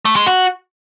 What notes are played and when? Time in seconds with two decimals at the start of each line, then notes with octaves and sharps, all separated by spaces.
0.05 A3
0.16 G#3
0.27 F#4